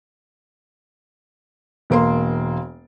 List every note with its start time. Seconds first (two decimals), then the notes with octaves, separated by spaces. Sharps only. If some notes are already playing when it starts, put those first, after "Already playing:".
1.90 E1 A#3 C6